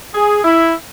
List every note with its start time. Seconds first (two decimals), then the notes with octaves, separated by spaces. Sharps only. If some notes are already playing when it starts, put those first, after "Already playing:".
0.14 G#4
0.43 E4